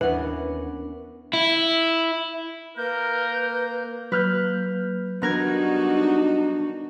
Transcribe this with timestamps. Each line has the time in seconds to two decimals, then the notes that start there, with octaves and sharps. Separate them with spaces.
0.01 D#2 E3 B3 C#4 D4 A#4 B4
1.33 E4
2.77 A#3 A#4 B4 G6
4.12 F#3 A#3 B4 F6 G6
5.22 G3 B3 D4 D#4 F#4 A#4 G#6